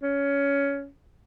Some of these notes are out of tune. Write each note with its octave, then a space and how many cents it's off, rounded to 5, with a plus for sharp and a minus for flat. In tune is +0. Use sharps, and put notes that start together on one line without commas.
C#4 +15